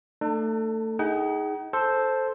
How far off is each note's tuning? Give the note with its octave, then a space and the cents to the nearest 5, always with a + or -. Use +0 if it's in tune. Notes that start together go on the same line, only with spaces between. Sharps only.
A3 +25 D4 +45 A4 +15
D#4 +30 G#4 +0 F#5 +45
A4 -5 C5 +0